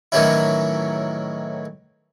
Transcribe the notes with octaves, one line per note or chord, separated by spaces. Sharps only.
A2 D#3 E3 F#3 C#4 E4